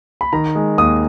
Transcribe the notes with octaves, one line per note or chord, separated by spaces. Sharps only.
B5
D#3 A#5
G#3
D#2 D#6